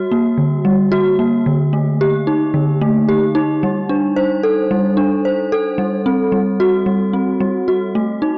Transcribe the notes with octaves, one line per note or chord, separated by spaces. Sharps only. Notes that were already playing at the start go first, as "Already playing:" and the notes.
Already playing: G3 F#4
A#3
D3
G3
F#4
A#3
D3
A3
G4
D#4
D3
A3
G4
D#4
G3
D4
C5
A4
G3
D4
C5
A4
G3
C4
G3
F#4
G3
C4
G3
F#4
A3
D#4